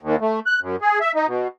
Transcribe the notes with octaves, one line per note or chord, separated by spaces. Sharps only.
D#2
A3
F#6
F#2
G#4
E5
D#4
B2